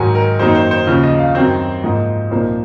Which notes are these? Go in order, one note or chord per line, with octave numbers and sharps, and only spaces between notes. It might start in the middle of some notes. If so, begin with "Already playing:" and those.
Already playing: G#2 D#3 F#3 G#5
A#4
F#2 D#3 A#3 D#4 C5
C5
C5
D#2 C#3 F3
D#5
F5
F#2 D#3 F#3 C4 C5
G#2 F3 A#3 D#4
C2 A#2 F3 A#3 D#4 C5